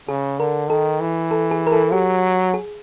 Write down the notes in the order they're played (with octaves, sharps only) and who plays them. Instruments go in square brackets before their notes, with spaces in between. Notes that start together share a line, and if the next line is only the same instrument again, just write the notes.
[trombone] C#3 [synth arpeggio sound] G#4
[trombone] D3 [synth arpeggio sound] A#4
[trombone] D#3 [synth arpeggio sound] A4
[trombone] E3
[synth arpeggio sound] A4
G#4
A#4
A4
[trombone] F#3 [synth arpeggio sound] G4
[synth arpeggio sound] G#4